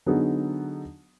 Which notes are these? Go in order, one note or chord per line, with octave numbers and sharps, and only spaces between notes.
D3 F#3 B3 D#4 G#4